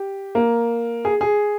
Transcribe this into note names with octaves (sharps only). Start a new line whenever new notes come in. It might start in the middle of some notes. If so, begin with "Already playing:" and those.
Already playing: G4
A#3
G#4
G#4